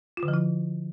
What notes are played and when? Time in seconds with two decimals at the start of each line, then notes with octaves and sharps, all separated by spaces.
0.17 F4
0.23 D3
0.28 F3
0.34 E4